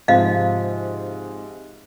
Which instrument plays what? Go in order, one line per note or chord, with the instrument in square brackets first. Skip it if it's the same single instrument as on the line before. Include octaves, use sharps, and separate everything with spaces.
[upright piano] G#2 C3 F3 [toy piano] D#5 F5